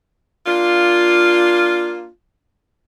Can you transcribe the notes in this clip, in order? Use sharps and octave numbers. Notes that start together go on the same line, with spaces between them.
A#3 D4 F4